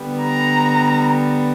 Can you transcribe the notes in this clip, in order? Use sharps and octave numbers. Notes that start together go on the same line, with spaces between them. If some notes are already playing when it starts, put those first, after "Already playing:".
Already playing: D3 G3 B3
A#5